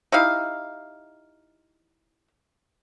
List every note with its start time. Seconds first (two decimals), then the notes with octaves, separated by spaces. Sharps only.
0.12 D#4 E4 G4 F5